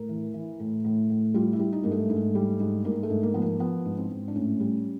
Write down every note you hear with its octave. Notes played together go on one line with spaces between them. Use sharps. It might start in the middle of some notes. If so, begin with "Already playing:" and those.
Already playing: A2 A#4
E3
E3
A2
A2
A2
G3 F4
E4
G3
D#4
G#2 A#3
A3
G#2
G3
G#2
G#2 A#3
A3
G#2
A#3
F3 B3
A#3
F3 B3
G#2
C4
G#2
D4
A2 C#4
G3